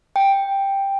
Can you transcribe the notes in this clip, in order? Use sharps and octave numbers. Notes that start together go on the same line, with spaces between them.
G5